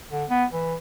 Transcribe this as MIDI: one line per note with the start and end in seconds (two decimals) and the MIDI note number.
0.12 0.24 50
0.30 0.45 59
0.53 0.75 52